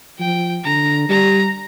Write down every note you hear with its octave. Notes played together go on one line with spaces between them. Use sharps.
F3 G5
D3 A#5
G3 A#5